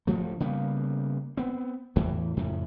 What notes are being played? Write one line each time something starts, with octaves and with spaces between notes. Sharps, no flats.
D1 G2 F3 A3
C#3 G3 A#3 B3
B3 C4
E2 A2 E3
F2 A2 C#3